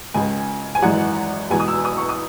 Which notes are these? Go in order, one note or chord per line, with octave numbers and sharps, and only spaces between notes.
C#2 C#3 G#3 G#5
G#5
G#1 F#2 E3 G#3 F#5
E2 B2 G#3 G#5
D#6
E6
D#6
C#6
D#6